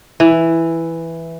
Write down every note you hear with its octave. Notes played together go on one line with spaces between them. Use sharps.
E3